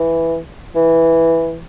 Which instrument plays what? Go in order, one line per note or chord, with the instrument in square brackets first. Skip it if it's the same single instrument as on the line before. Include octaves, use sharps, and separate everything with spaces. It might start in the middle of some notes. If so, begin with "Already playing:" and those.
Already playing: [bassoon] E3
E3